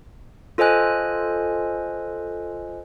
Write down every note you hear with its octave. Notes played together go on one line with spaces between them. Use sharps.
F4 A4 C5 D#5 G#5 F#6